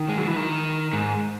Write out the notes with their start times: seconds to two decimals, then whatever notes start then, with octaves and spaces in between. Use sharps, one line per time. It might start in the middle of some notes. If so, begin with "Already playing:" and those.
Already playing: D#3
0.09 G#3
0.18 F#3
0.27 E3
0.36 D#3
0.93 G#2